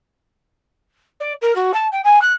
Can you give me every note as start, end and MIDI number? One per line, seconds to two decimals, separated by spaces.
1.20 1.33 74
1.42 1.55 70
1.55 1.72 66
1.74 1.88 81
1.92 2.01 79
2.04 2.22 80
2.22 2.33 90